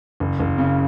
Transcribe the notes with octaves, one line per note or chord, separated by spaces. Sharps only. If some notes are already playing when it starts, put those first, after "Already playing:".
F#1
F#1
C#3